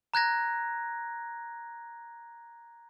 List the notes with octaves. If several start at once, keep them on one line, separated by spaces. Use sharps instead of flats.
A#5 F#6 G#6 A#6